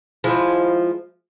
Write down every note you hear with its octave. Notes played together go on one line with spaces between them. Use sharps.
F3 G#3 E4